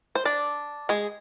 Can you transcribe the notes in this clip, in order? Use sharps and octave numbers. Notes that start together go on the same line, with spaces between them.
C5
D4 D5
G#3 G#4